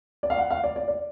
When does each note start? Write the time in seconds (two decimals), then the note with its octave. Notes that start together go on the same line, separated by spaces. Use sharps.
0.23 D5
0.30 F5
0.38 F#5
0.50 F5
0.64 D5
0.76 D5
0.88 D5